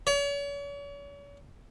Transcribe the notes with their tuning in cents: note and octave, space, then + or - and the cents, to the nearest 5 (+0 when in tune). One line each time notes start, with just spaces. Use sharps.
C#5 +40